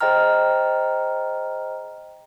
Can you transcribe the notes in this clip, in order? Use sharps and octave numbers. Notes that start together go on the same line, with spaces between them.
G#4 C5 D#5 G5 A#5 F6